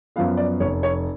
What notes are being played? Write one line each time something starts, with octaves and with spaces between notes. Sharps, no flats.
F#2 F3 B3 F5
D5
F1 C#5
C#5